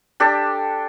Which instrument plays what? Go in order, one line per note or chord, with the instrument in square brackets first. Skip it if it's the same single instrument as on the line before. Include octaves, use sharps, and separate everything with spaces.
[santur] D4 G4 A4